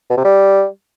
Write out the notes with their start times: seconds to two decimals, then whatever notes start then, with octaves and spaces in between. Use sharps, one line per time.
0.10 B2
0.17 C3
0.24 G3